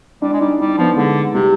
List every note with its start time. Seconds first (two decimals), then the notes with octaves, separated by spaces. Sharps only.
0.22 G3 D4
0.33 G#3
0.41 G3 D#4
0.60 G3 D4
0.78 F3 B3
0.96 D3 G#3
1.33 C3 G3